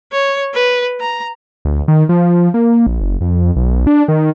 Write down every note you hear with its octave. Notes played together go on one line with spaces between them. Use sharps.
C#5
B4
A#5
D2
D#3
F3
A#3
A#1
F#1
F2
B1
D4
D#3